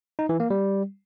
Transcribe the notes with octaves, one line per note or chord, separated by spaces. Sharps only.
D#4
E3
A#3
G3